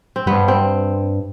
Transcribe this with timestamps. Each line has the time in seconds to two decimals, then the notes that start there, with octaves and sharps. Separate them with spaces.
0.16 C4
0.26 G2 B3
0.48 C4